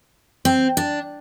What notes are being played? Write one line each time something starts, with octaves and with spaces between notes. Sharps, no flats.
C4
D4